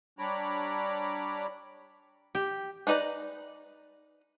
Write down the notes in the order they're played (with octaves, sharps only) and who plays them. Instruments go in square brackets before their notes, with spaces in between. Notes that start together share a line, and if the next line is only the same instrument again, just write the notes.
[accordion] G3 D4 C#5 A#5 B5 D6
[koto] G4
[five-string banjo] D4 D#4 B4 D5 A#5